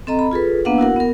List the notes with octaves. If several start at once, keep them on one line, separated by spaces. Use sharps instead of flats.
C4 A4 D#5 A#5
B5
F4 G#4 A4 B4
A#3 B3 D4 B4 F5 F#5
E4 F#4 A#4 F#5
B3 A#4